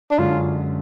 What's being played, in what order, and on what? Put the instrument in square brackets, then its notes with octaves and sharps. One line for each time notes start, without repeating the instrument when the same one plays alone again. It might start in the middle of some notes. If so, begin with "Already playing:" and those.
[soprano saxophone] D4
[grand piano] F#2 D3 G#3 C#4 [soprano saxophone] F4